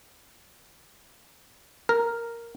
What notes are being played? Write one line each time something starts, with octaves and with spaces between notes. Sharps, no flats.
A#4